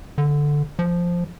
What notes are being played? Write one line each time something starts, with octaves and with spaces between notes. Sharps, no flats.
D3
F3